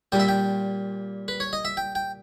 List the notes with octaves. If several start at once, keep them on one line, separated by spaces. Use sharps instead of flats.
A#2 G3 G5
E5
G5
B4
C#5
D#5
E5
G5
G5